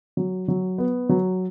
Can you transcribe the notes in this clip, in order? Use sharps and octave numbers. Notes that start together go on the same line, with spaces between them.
F#3
F#3
B3
F#3